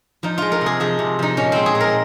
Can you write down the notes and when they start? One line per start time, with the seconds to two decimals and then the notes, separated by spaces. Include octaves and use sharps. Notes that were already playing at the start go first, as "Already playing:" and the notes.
0.23 F3 D#4
0.38 G#3 F4
0.52 A#4
0.61 C3
0.66 G#4
0.80 F3 G#4
0.99 C3
1.19 F3 D#4
1.37 A#2 C#4
1.52 G#3 C4
1.66 G#4
1.75 A#2
1.80 A#4